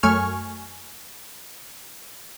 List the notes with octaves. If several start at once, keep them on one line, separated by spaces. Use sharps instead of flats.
F#2 A3 G#5 C#6 F6